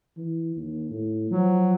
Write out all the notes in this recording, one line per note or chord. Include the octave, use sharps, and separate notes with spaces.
E3
D#2
A2
F3 F#3